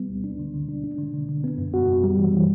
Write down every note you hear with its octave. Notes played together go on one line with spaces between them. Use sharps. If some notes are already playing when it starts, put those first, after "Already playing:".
Already playing: G3 B3
D2
D4
D3
D3
D4
D4
D3
D3
D3
B3
F#2
F#4
F#2
G3
E3
E3